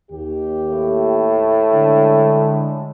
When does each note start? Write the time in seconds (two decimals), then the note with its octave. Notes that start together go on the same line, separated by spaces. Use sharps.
0.11 D#2 G4
0.69 A2
1.72 D3 G#3 D4